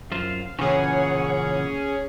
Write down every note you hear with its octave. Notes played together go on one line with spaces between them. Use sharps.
F#2 F4 C5 F5
A#2 C#3 E3 C#4 G#4 C#5 F#5